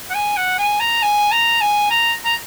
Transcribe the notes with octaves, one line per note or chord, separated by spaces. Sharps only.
F#5
G#5
F#5
G#5
A#5
G#5
A#5
G#5
A#5
A#5